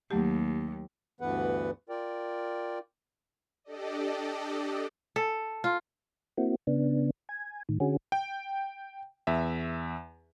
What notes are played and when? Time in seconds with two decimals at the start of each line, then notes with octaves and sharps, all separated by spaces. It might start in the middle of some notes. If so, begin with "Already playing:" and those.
0.11 D#2 F#3 A3 G4
1.21 D2 G2 E3 B3 B4 F#5
1.89 F4 A#4 D5 G5
3.64 D4 G4 A4 D5 D#5
5.16 A4
5.64 F4
6.38 A#3 C4 E4 F#4
6.67 C#3 B3 D4
7.29 G#5
7.69 A2 D#3
7.80 D3 C#4 F#4 G#4
8.12 G5
9.27 E2 E5